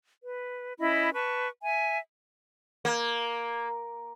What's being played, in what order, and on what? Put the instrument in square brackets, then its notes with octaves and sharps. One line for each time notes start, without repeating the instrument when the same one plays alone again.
[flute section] B4
C#4 E4 D#5 B5
B4 A5 C#6
E5 G#5
[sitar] A#3